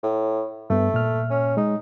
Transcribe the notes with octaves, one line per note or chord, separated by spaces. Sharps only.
A2
G2 A3 B3
A#2 F6
C#4
G#3 D#4